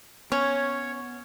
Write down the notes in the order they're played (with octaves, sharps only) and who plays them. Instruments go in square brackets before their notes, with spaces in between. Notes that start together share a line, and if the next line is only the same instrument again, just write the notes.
[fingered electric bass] B3 [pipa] C#4 [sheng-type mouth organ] C#5